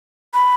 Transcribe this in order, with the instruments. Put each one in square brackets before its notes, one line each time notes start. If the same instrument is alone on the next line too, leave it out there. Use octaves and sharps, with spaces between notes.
[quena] B5